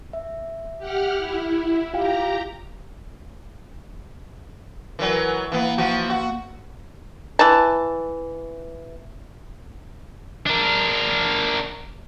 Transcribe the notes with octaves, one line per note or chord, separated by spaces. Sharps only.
E5
G4 F#5 F6
E4
F4 G4 F5 G5 A#5
E3 F#3 A#4 B4 G#5
E3 A#3 B3 F5
E3 F3 F#4
F#4
E3 A5
D4 A#4